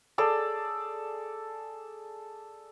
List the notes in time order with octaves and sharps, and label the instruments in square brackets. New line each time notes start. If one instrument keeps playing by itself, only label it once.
[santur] G#4 A4 D5